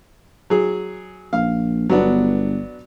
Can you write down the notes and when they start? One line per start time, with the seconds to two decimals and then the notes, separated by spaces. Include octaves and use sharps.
0.50 F#3 G#4
1.33 A#1 F5
1.90 G1 F#3 B3 D4